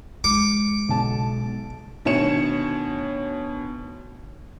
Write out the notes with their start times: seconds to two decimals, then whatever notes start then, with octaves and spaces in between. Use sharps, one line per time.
0.24 G#3 D6 C#7
0.89 B1 A5
2.05 D2 B2 D#3 C#5 C#7 E7